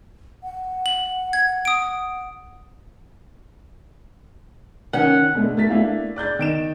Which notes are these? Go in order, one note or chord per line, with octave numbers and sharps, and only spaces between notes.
F#5
F#7
G#6
D#6 D7
D#3 C#4 F#5
B2 D3 G#3 A3
A3 F#4 A6 B6
A3 A#3 D4 E4 F5
D5 F#6 G6 A6
D#3 D7 E7